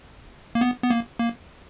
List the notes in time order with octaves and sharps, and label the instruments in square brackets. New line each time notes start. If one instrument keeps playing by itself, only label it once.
[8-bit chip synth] A#3
B3
B3
A#3
A#3